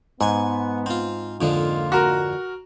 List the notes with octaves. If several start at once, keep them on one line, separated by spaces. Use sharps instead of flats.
G#2 B3 F#5 G#5
C4 F4
F2 D3 G#3 A#3 D#4 F4
F#4 A#4